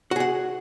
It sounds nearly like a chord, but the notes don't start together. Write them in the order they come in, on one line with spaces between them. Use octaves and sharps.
F#4 G#4 F#5